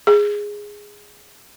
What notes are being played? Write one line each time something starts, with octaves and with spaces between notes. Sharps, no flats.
G#4